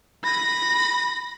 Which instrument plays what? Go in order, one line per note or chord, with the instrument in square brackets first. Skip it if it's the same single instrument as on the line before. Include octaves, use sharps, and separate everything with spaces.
[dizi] B5 [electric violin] A#6